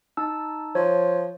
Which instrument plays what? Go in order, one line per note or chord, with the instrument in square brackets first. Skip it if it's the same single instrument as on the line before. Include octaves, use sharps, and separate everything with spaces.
[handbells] D#4 A5 E6
[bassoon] F3 [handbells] C#5